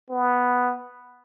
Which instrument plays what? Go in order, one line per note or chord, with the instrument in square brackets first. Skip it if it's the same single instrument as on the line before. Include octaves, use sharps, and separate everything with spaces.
[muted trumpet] B3